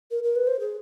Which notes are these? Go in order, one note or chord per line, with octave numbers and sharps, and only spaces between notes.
A#4
A#4
B4
C5
G#4